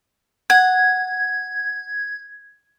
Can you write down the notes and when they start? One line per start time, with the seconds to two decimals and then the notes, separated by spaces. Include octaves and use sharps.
0.50 F#5 G#6